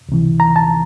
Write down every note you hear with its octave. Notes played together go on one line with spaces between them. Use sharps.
C#2 C3 E3
A#5
A5